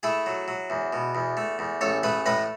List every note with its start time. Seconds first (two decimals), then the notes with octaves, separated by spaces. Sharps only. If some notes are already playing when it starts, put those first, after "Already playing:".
0.03 A3 E4 G#4
0.26 F#3
0.48 F#3
0.70 E2
0.93 B2
1.15 E2
1.37 A3
1.59 E2
1.81 A1 A4 C#5
2.03 A3 G#4 B4
2.26 A2 B4 D#5